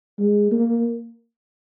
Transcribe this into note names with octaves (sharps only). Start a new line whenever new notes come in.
G#3
A#3